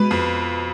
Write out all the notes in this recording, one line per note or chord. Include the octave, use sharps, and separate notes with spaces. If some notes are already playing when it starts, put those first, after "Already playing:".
Already playing: B2 G#3 B4
F2